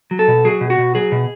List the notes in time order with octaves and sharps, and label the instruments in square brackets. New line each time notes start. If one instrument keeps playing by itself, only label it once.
[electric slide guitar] F#3
A4
B2
F#3 G#4
B2
F#4
B2
F#3 G#4
B2